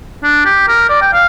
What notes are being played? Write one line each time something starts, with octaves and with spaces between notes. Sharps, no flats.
D4
G4
A#4
D5
G5
F5